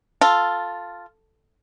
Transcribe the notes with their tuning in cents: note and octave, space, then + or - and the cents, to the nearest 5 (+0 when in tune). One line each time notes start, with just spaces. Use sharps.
F4 +0 A4 +0